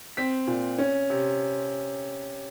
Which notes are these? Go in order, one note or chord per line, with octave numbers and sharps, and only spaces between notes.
C4 B6
A#2
C#4
C3